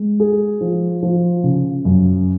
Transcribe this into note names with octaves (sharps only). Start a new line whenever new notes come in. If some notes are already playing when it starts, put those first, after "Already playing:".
Already playing: G#3
G#4
F3
F3
C#3
F#2